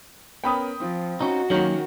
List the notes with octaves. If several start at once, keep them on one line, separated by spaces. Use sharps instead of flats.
B3 C#4 A#4 G5 B5 D#6
F3 C4 F4
C#4 D#4 F#4
D#3 F#3 A#3 C#4 A#4 C#5 F#5